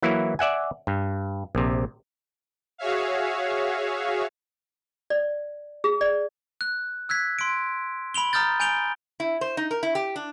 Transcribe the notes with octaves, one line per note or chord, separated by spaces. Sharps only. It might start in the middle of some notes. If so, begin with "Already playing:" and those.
E3 F#3 A#3 E4
D5 E5 F#5 G#5
G2
A#1 C3
F#4 G#4 C#5 E5 F5
D5
G#4
D5
F#6
E6 F#6 G#6 B6
C6 D7
B5 D7 F7 G7
A#5 D#6 F6 G6 A6
G#5 G6 D7 F7 G7
E4
C5
D#4
A#4
E4
G4
D4